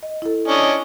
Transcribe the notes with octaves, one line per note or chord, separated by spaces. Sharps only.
D#5
E4 A4
C#4 D4 D#5